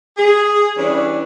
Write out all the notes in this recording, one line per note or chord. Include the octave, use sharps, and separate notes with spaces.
G#4
E3 G3 C#4 D4